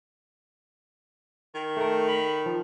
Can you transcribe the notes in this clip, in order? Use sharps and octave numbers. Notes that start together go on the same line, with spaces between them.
D#3
A3 A#4
B5
F3